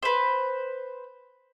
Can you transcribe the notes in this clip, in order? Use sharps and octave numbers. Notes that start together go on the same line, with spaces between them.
B4 C5